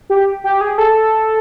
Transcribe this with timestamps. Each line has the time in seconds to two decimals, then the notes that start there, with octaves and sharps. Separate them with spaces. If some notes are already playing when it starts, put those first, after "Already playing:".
0.10 G4
0.44 G4
0.61 G#4
0.78 A4